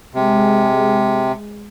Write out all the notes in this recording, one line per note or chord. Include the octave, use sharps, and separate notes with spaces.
C3 G#3